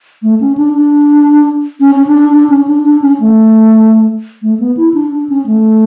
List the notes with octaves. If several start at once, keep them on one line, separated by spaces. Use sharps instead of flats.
A3
C#4
D4
D4
C#4
C#4
D4
D4
C#4
D4
D4
C#4
A3
A3
B3
E4
D4
D4
C#4
A3